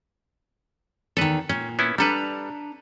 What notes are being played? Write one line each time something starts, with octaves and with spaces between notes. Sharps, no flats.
E2 D#3 A4 B4
A#2 C#4
B3 C#4 E4
G3 D4 A4 B4 A#5